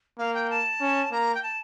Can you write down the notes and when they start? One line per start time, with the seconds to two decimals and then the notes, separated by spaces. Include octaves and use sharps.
0.19 A#3 F5
0.34 G5
0.50 A5
0.81 C#4
1.12 A#3 A#5
1.35 G5
1.43 A5